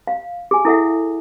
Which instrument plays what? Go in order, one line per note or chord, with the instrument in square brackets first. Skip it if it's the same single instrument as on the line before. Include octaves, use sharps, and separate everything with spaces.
[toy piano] F5
G#4 G#5
E4 A4 E5 F#5